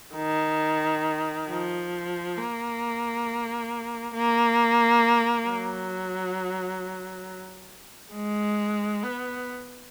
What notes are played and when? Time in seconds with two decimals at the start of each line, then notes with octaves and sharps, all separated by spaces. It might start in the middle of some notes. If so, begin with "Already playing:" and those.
0.15 D#3
1.49 F3
2.38 A#3
4.14 A#3
5.48 F#3
8.14 G#3
9.03 B3